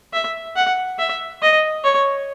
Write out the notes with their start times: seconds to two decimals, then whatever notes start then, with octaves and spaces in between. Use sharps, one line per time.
0.13 E5
0.56 F#5
0.99 E5
1.42 D#5
1.84 C#5